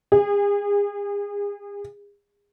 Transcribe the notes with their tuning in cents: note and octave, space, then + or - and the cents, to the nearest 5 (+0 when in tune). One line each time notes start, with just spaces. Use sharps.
G#4 -35